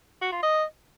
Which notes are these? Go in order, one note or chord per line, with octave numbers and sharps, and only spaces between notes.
F#4
F4
D#5